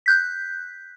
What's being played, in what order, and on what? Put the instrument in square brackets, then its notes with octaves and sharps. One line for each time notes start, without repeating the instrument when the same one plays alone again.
[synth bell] F#6 G6 B6